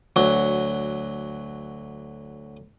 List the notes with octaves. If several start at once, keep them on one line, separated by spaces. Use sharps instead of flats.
D2 F#3